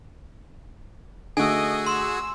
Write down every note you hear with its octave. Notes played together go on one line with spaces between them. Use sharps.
D3 A3 F#4 G#4 D#5 G#5 E6
C6 E6